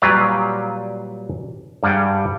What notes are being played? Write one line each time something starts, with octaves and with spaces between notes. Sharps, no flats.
A#2 F#3 G3 B4 D5 F5
G2 G3 G#4 F#5 G5